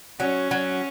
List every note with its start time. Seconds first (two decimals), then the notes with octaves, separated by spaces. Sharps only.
0.20 F#3 C#4
0.51 F#3